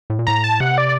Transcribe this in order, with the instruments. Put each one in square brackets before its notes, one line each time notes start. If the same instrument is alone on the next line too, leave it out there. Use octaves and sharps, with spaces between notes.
[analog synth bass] A2
A#2
[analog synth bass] A2 [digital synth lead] A#5
[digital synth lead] A5
[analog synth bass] C3 [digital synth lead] F#5
[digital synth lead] D5